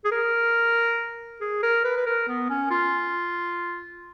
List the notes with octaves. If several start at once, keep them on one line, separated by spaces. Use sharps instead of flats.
G#4
A#4
G#4
A#4
B4
B4
A#4
B3
C#4
F4